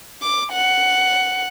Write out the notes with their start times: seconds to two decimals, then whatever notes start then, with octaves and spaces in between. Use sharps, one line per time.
0.22 D6
0.52 F#5